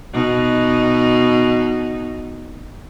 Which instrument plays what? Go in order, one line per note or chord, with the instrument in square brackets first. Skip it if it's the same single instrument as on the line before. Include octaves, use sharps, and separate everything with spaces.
[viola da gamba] B2 D#4